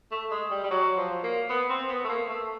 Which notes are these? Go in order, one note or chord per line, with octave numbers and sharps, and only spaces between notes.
A3
G#3
G3
G3
F#3
F3
A#3
B3
C4
B3
A3
A#3
A3